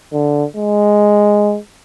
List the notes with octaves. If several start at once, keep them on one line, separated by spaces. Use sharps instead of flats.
D3
G#3